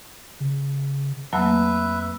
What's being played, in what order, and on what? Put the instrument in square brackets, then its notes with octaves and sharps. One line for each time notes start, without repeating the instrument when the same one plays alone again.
[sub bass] C#3
[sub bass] F2 [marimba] F#3 A3 A#3 [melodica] B4 E5